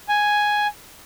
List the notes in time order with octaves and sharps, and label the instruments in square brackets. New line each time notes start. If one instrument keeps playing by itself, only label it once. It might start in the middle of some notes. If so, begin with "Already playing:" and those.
[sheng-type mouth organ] G#5